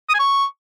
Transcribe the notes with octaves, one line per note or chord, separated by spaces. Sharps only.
D#6
G#5
C#6